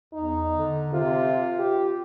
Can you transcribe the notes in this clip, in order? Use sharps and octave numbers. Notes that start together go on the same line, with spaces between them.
E2 D#4
D3
C3 F4
G4